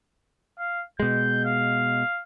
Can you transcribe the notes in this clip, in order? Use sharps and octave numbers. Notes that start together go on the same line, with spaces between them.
F5
B2 G#3 G6
F5